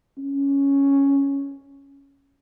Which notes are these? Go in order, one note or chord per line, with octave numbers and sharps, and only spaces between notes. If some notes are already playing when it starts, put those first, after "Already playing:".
C#4